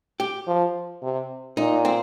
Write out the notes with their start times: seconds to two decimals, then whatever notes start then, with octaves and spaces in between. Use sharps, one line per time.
0.20 G4
0.47 F3
1.02 C3
1.57 A#2 D#4
1.85 C4